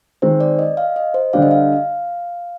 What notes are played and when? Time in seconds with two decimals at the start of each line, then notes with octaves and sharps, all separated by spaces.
0.22 D#3 G#3 C4 C5
0.40 D5
0.59 D#5
0.77 F5
0.96 D#5
1.14 C5
1.33 D3 G3 D4 G4 F5
1.42 D#5
1.51 F5